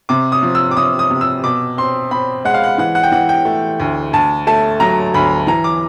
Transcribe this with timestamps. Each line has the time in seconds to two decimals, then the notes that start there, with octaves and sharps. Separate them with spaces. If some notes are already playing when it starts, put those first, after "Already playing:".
0.09 C3 D6
0.32 D#6
0.43 F3
0.55 E6
0.71 D6
0.77 C3 D#6
0.99 D#6
1.10 C3
1.21 E6
1.44 B2 D6
1.78 C4 C6
2.11 C4 B5
2.45 G#3 F#5
2.54 F5
2.63 F#5
2.78 E3 F#5
2.95 F#5
3.03 G5
3.12 E3 F#5
3.29 G5
3.45 A3
3.80 D2
4.13 D2 A5
4.47 A3 A5
4.80 F#3 A#5
5.14 D2 B5
5.47 E3 A#5
5.64 D6